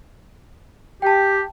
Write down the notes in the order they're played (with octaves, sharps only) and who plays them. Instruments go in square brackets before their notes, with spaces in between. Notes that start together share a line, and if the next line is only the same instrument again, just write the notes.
[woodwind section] G4 [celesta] G5 A5